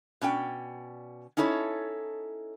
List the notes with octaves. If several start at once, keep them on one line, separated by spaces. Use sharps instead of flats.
B2 C#4 D5 G5
C#4 D#4 E4 A4 C#5